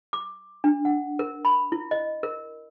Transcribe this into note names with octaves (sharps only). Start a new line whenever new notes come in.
D6
D4
F#5
A#4
B5
E4
D#5
A#4